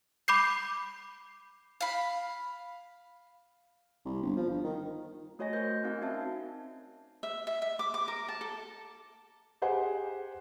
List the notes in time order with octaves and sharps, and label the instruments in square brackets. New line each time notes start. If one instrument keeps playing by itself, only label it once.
[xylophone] B5 D6 G6 C7
[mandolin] F5 B5
[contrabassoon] C2
G1
F3
G1
D#3
[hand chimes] A3 F#4 C#5 D#5 G#5 A#6
A#4 C5 G#5 G6
C4 D#4 F#4 A#4 F5 G#5
C#4 F#4 E5 A5
[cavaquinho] E5
E5
E5
D6
D6
A#4
A5
A4
[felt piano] G4 G#4 C5 F#5 G#5